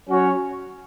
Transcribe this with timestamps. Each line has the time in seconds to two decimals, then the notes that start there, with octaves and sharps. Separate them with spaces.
0.09 F#3 C#4 F#4 C#5